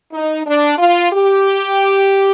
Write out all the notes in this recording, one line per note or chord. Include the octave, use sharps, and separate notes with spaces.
D#4
D4
F4
G4